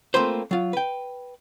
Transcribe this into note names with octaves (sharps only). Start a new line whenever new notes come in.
A3 A#3 C4 F4 B4 C5
F#3 F4
B4 G5